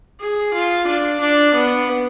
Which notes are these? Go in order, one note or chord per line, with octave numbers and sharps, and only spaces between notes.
G#4
F4
D4
D4
B3